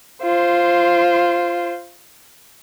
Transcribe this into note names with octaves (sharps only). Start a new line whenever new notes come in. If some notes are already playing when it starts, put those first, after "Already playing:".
F4 C5